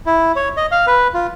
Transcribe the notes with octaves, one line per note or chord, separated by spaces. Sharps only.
E4
C#5
D#5
F5
B4
F4